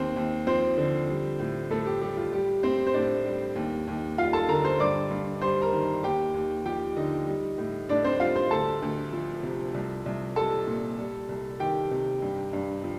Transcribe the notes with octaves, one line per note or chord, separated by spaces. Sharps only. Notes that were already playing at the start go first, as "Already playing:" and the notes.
Already playing: D#2 C4 C5
D#2
F3 C4 C5
D3
G3
A2
A2 A3 A4
G4
G3 G4
F4
G3 G4
A2 C4 C5
C5
A2 D4 D5
G3
D#2
D#2
G3 F4 F5
A4 A5
D3 A#4 A#5
C5 C6
G2 D5 D6
G2
G3 C5 C6
A#4 A#5
D#3
D#2 G4 G5
D#2
F3 G4 G5
D3 D#4 D#5
G3
A2
A2 D4 D5
C4 C5
G3 F4 F5
C5 C6
D2 A4 A5
D2
F3
C3
C2
C2
G3 A4 A5
A#2
G3
C2
D#3 G4 G5
C3
G2
G2
F3